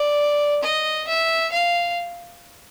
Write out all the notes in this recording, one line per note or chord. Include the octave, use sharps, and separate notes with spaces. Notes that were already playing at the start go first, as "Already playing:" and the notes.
Already playing: D5
D#5
E5
F5